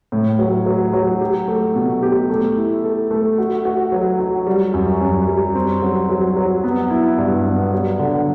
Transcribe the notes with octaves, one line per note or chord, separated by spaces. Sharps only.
A2
F#3
F#3
F#3
G4
A3
B2
G4
A3
E4
A4
A3
F#4
F#4
F#3
F#4
G3
F#2
F#2
G3
C4
F#3
F#3
F#3
B3
E4
G2
B3
F#3
D3